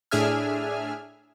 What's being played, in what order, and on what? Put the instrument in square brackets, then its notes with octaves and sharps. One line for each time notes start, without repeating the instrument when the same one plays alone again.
[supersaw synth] A2 D4 G#4 E5 G#5 F6